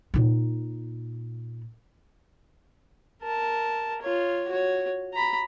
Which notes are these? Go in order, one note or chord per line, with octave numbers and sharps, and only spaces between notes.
A#2 D#4
A#4 A5
F4 C#5
F#4 C#5
A#5 B5